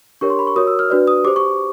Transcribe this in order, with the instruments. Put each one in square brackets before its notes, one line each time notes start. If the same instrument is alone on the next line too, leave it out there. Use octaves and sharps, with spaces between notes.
[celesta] D4 G4 A#4 C#5 C#6
C6
B5
C#6
F#4 A#4 C#5 D#6
E6
F6
D4 F#4 B4 D5
D#6
G4 C5 D6
C#6